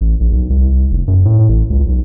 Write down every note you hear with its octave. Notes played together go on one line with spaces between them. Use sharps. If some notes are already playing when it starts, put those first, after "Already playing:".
A1
A#1
B1
C2
F1
F#2
A2
A1
C#2
B1